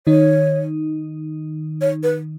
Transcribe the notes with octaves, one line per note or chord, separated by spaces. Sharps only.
D#3 D#4 C#5
C#5
B4